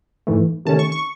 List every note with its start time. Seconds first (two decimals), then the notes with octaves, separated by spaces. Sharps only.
0.27 G#2 E3 A3
0.65 C3 D#3 A3 C#4 A5
0.79 C#6
0.92 C#6